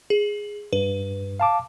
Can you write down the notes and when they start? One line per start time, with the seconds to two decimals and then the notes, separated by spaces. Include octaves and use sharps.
0.10 G#4
0.73 G2 B4
1.40 F5 A5 D6